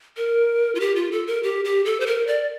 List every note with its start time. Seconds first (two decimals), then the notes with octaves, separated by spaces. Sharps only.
0.17 A#4
0.75 F4
0.80 G4
0.96 F4
1.12 A4
1.27 A#4
1.43 G4
1.65 G4
1.85 A4
2.00 C5
2.07 A#4
2.27 D5